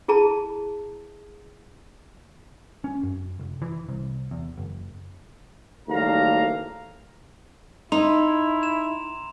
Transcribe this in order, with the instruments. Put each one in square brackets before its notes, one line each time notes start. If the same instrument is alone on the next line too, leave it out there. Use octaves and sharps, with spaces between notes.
[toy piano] E4 G#4 A5 A#5
[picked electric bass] C#4
F#2
F1
E3
C2
E2
F#1
[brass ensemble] F#1 D#2 G3 A3 F5 A#5
[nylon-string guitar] D#4 [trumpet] E4 [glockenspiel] A#5 C6 F7
[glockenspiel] E7